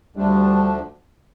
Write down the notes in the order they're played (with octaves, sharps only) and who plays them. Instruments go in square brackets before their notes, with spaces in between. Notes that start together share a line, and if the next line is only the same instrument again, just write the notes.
[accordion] D2 D3 F3 A3 D4 [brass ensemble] G3